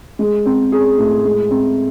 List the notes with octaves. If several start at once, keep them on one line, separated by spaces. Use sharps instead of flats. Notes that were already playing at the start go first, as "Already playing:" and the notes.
G#3
C4
G#4
A2
G#3
C4